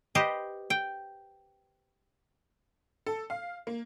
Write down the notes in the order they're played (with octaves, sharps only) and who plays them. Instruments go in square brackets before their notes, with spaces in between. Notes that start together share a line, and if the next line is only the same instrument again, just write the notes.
[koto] G4 B4 C5 D#5
G5
[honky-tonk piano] A4
F5
A#3